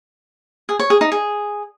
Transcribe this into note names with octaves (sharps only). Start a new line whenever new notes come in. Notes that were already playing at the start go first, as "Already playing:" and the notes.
G#4
C#5
G#4
D#4
G#4